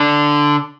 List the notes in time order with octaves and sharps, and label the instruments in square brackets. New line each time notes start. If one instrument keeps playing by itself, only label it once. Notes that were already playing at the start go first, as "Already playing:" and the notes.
Already playing: [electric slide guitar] D3